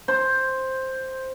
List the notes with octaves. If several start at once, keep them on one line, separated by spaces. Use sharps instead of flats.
C5